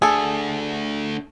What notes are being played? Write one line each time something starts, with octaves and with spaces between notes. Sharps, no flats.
A3 D4 G#4 A4